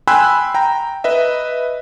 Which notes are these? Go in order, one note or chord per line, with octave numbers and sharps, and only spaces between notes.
G5 G#5 B5 C6 E6 F#6
G5 A#5
B4 D#5 E5